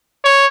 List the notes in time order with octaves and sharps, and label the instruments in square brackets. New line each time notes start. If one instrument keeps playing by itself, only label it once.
[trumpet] C#5